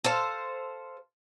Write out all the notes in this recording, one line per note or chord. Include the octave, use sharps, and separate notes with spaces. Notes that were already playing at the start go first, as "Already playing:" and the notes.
A4 C5 F5